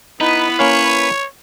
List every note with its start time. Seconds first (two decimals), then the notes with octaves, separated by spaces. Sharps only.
0.21 B3 D#4 E4 B4
0.59 A#3 C#4 C#5 F5